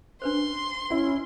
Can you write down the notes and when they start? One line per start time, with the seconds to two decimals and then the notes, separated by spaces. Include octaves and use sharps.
0.22 D4 B4 C5 C6
0.90 C#4 E4